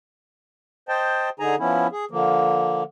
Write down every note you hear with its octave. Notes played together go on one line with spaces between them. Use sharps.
C5 D#5 G5 A5
D3 D#4 G#4 G#5 A#5
F3 B3 C#4 E4
G#4
D3 F3 A#3